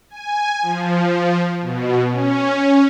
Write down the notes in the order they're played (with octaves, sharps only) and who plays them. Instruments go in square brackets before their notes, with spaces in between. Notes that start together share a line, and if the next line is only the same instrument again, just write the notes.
[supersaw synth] G#5
F3
B2
C#4